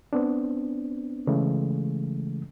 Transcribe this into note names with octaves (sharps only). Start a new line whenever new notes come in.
B3 C4 D4
C#3 E3 G#3 A3